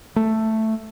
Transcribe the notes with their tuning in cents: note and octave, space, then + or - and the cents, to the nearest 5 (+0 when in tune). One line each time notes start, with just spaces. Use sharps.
A3 +5